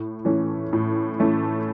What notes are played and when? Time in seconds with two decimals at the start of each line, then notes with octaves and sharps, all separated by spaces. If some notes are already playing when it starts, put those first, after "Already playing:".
Already playing: A2
0.25 E3 A3 C#4
0.73 A2
1.19 E3 A3 C#4